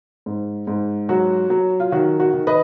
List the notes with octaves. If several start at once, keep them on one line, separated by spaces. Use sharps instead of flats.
G#2
G#2
F#3 F#4
F#3
F4
D#3 F#4
F#4
D#3
B4 D#5